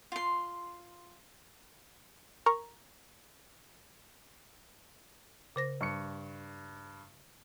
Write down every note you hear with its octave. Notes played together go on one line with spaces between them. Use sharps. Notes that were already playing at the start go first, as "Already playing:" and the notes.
F4 C6
A#4 A#5 C#6
C#3 C5 A#6
G2 C#6 C#7